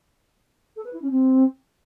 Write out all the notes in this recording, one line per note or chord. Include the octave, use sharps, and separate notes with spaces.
A4
B4
E4
C#4
C4